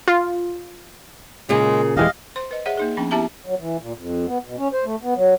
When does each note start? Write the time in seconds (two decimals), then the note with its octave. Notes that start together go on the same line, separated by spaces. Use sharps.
0.08 F4
1.49 A#2 C#3 G#3 A#3 G#4
1.97 D#1 E3 G#3 G4 D#5 F5
2.36 C5 C6
2.51 B4 D#5
2.66 G#4 C#5 E5 F#5
2.77 A#3 D#4 G#4
2.97 F3 B3 C#4 D4 G5
3.11 B3 E4 G4 E5 A5 A#5
3.46 F#3
3.59 E3
3.81 A#2
3.98 F2
4.27 B3
4.45 B2
4.58 C#4
4.73 C5
4.85 A3
5.03 B3
5.16 F#3